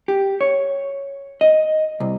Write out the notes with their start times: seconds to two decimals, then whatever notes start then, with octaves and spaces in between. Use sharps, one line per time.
0.08 G4
0.41 C#5
1.41 D#5
2.00 C2